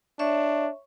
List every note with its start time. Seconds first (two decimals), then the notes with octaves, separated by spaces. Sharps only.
0.19 D4 C#5 E5 C#6